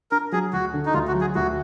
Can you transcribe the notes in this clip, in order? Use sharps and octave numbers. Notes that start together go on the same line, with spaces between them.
D4 A#4
F#3 G#4
D2 F#4
D3
D#4
D2 F4
F#4
F#3
G#4
D2 F#4